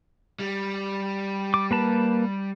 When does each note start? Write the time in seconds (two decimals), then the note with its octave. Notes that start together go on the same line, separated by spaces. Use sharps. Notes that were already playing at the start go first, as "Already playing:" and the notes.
0.39 G3
1.54 D6
1.71 A#3 B4 A5